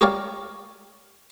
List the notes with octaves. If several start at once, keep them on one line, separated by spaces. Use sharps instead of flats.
F#4 G4 A#4 C#5 D5 F5